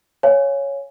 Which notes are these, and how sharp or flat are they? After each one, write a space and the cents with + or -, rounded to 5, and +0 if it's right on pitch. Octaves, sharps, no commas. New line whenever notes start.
C#5 +0 F5 +0 G#5 +0